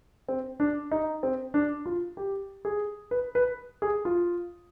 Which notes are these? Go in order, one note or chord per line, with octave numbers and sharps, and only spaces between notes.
C4
D4
D#4
C4
D4
F4
G4
G#4
B4
B4
G#4
F4